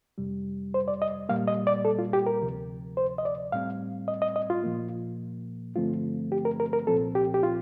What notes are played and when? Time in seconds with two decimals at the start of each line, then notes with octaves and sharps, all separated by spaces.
0.18 F2 C3 G3
0.74 C5
0.88 D5
1.02 D#5
1.29 A#2 G3 A#3 F5
1.48 D#5
1.67 D5
1.85 A4
1.99 F4
2.13 G4
2.26 A#4
2.41 D2 C3 F3
2.97 C5
3.18 D#5
3.25 D5
3.52 A2 G3 C4 F5
4.08 D#5
4.22 D#5
4.36 D#5
4.50 F4
4.63 A#2 F3 A#3
5.76 G2 D3 F3 A3 C4 F4
6.32 G4
6.45 A#4
6.60 A#4
6.73 A#4
6.87 C2 A#2 F3 C4 A4
7.15 G4
7.34 G4
7.43 F4